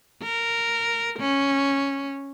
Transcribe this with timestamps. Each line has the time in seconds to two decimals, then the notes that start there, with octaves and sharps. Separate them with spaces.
0.22 A#4
1.19 C#4